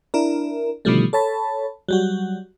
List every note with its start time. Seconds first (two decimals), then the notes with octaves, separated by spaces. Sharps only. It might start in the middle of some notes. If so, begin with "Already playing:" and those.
0.14 D4 E4 A#4
0.85 B2 D3 D#3 F3 G3 A3
1.13 A4 C#5 A5 B5
1.89 F#3 G3 F#4